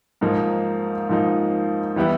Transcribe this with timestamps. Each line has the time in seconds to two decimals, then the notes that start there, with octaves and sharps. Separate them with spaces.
0.21 G#2 F3 A#3 D#4
1.09 G#2 F3 A#3 D#4
1.96 E3 G3 B3 E4 G4